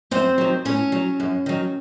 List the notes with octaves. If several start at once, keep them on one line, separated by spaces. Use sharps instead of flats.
F#2 C4 C5
D#3 F#3
A2 C#4 C#5
F#3
F#2
D#3 F#3